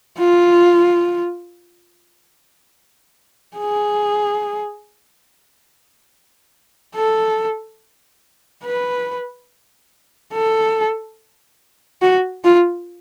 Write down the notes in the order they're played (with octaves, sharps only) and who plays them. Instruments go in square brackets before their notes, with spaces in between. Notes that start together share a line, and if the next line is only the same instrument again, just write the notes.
[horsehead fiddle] F4
G#4
A4
B4
A4
F#4
F4